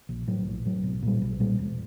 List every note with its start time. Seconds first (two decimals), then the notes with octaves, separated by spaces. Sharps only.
0.09 A#1
0.28 A2 F#3
0.47 A#1
0.65 A2 F#3
0.84 B1
1.03 A#2 G3
1.22 B1
1.40 A#2 G3
1.59 E1